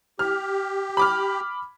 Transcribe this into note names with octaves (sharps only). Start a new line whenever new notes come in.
G4 F6
B5 D6 F6